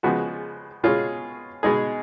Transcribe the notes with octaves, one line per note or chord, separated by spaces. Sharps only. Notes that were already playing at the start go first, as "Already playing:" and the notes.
C#3 F3 G#3 B3 F#4
B2 G#3 C#4 F4 G#4
B2 G#3 D#4 G#4